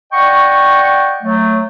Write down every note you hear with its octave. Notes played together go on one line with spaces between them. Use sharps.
D5 D#5 F#5 G5 C#6
F#3 A3